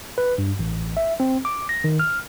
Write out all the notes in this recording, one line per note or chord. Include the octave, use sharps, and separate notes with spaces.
B4
G2
A1
E5
C4
D6
A#6
D#3
F6